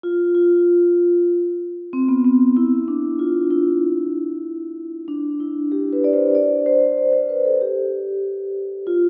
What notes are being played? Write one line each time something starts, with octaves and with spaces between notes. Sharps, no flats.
F4
F4
C4
B3
C4
E4
D4
F4
E4
D4
E4
G4
B4
D5
C5
D5
C5
D5
C5
B4
A4
G4
F4